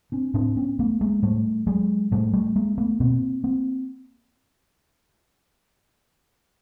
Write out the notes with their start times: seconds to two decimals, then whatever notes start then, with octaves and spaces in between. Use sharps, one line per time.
0.12 C4 D4
0.34 A2 C4 D4
0.57 B3 C#4
0.79 A3 B3
1.01 G#3 A#3
1.22 A2 G3 A3
1.67 F#3 G#3
2.12 A2 G3 A3
2.33 G3 A3
2.56 G#3 A#3
2.78 A3 B3
3.00 B2 A#3 C4
3.44 A#3 C4